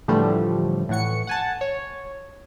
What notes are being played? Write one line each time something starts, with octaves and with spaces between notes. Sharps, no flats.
A2 D3 E3 F3 G3 A3
A2 E3 F#5 C#6 C#7
F#5 G#5 A5
C#5